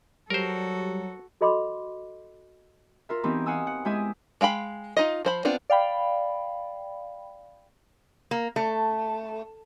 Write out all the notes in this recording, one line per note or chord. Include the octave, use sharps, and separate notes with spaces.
F#3 G3 F#4 A4 A#4 C5
F#4 A4 D#5 B5 C6 D6
F4 A#4 E5
E3 B3 C4 D#4 G4
F5 F#5 G#5 D#6 E6
F#5
G#3 E4 G4 E5 G#5 D#6
G#3 F5 G5 B5
D#4 F4 D#5
F3 C5 B5
B3 C4 D4 F4
D5 F5 G5 B5
A#3
A3